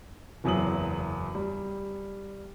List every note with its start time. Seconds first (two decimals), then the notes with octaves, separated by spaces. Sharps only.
0.44 F#1 E2 F#3 D#6 F#7
1.35 G3